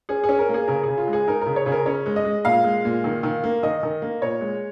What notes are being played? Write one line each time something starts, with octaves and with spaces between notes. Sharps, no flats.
C#4 G#4
G#4
C#4
A#4
A#3 G#4
C#3 A#4
C#3 G#4
F4
G#3
G#4
D#4 A#4
C#3 A#4
C#5
C#3 G#4
A#4
C#4 C#5
G#3
D#5
G#3
A#2 F5
G#3
A#2
D#3
D#3
A#3
D#3 D#5
D#3
A#3
A#2 C#5
G#3